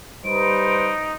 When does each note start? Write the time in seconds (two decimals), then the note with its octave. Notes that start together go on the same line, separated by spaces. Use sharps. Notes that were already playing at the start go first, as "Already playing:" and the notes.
0.25 G3 D#4 B4 C5 D7